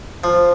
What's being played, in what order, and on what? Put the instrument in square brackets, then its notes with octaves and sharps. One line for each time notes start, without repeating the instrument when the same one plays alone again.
[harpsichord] F3